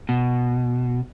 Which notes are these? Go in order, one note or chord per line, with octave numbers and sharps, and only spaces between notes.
B2